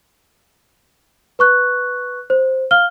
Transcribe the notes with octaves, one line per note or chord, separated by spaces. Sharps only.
B4 C#6 F#6
C5
F5 F6 G7